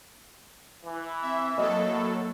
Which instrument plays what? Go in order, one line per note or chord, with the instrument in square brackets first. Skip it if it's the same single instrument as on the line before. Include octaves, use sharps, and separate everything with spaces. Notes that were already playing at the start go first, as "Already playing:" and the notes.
[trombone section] E3
[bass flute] C4 [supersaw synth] E5
[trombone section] A2 [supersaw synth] F#3 A4 [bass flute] A#3 [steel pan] D#5